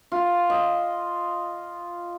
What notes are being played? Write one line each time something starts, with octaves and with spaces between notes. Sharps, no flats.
F4
D#5